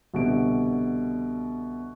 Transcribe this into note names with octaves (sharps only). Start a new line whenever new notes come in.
C2 B2 D3 D7